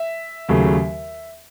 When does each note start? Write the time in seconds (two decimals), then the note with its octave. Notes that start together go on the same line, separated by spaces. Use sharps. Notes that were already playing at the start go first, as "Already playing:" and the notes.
Already playing: E5
0.48 D#2 C#3 F#3 A3